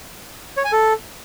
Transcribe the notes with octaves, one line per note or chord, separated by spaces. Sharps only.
C#5
G#5
A4